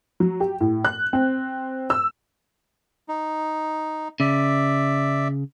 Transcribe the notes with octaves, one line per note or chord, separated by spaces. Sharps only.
F#3
G4
A2
F#6
C4
E6
D#4
C#3 D5 E5